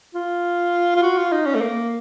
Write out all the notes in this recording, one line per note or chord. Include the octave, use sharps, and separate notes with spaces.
F4
F4
F#4
F4
D#4
C#4
A3
A#3